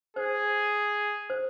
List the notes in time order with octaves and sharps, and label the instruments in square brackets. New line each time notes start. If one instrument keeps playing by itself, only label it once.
[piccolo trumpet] G#4 [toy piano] C5
[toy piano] C5